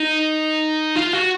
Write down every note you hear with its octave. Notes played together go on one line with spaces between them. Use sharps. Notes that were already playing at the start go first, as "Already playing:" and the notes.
Already playing: D#4
F4
F#4